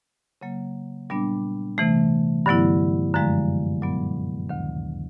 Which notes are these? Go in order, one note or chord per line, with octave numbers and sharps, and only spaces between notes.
C#3 F#3 A#3
A#2 G3 B3 D4
C3 E3 A3
G2 D3 F#3 B3 E4
F#2 D3 F3 G#3
A#2 F#3 B3
D2 C3 D#3